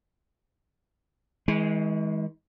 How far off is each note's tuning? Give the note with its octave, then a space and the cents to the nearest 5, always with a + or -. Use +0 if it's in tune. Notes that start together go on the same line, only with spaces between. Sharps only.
E3 -45 G#3 +0